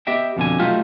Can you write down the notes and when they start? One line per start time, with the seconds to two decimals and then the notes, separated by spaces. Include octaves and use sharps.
0.07 B3 G4 D#5 E5 G5
0.37 F2 B2 D3 G#5
0.59 F#3 A3 D#4 F4 G4